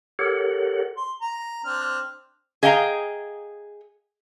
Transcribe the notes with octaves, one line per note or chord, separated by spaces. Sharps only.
G4 A4 A#4 C#5 F#5
C6
A#5
C4 D4 F6
G#4 D#5 F5 G5 A#5